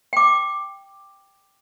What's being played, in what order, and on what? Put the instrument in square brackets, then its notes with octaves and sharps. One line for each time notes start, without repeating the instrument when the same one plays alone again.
[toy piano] G5 D6